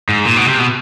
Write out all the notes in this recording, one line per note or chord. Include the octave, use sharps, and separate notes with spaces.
G#2
A#2
B2
C3
B2